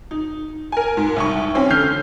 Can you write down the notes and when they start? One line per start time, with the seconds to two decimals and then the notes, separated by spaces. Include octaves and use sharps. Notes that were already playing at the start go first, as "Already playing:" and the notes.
0.11 D#4
0.72 A#4 G#5
0.97 G#2
1.16 C2 D#4 C#6
1.55 C4 C#4
1.70 D3 F6 G6 C7